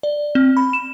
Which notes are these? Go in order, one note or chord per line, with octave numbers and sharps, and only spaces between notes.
D5
C4
B5
E7